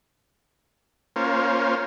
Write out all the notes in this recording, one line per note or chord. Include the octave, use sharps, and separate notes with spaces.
A#3 C#4 F4 C5